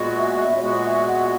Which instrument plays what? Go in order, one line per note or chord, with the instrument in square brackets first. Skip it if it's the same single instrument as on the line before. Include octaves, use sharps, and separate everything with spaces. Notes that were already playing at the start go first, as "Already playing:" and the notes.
Already playing: [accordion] A#2 G#3 B3 F#4
[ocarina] E5
D#5
E5
C#5
[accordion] A#2 G#3 B3 F#4 [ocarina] D#5
[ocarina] E5
F#5